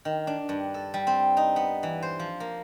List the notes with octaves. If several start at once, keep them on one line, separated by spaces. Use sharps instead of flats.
D#3
D4
G2
A4
G3
C4
D#4
B3
E3
C5
F3
A#3